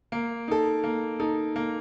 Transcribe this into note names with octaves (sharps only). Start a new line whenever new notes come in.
A#3
D#4 A4
A#3
D#4 A4
A#3